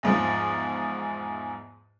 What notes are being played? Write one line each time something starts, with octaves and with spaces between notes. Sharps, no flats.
E2 G#2 F3